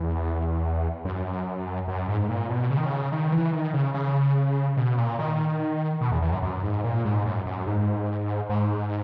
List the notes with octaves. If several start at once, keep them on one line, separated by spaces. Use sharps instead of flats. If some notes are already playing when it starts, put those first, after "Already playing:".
Already playing: E2
F#2
F#2
G#2
A#2
B2
C#3
D#3
C#3
D#3
E3
D#3
C#3
C#3
B2
A#2
D#3
B2
E2
E2
F#2
F#2
G#2
A#2
G#2
F#2
F#2
G#2
G#2